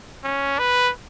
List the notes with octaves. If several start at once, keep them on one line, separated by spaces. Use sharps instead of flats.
C#4
B4